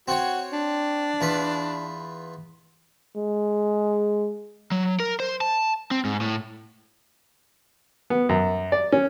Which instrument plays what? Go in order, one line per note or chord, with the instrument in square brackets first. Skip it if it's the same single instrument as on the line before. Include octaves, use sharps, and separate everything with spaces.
[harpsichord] C4 C#5 [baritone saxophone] F#4
[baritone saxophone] D4
[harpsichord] E2 F4 B4
[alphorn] G#3
[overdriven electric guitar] F#3
A#4
C5
A5
C4
G#2
A2
[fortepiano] B3
F#2
D5
C#4